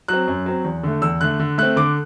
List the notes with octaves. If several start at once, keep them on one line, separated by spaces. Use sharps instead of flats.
F#3 C4 F#6
F#2
F#3 C4
E2
D3 A3
E2 E6
D3 A3 F#6
D3
A3 C4 F#6
D3 D6